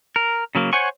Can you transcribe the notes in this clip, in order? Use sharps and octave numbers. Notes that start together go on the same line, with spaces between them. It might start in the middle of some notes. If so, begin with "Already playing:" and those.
A#4
C#3 F#3 A#3
C5 C#5 F#5 G#5 C#6